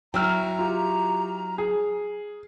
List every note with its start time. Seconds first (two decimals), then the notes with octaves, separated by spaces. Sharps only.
0.14 F#3 E4 G5 A#5 E6 F6
0.59 F4 G4
1.58 G#4